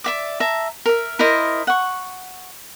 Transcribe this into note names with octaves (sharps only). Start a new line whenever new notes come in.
D5 E5 D6
E5 A5 A#5
A#4 E5
E4 A#4 C5 D#5
F#5 C#6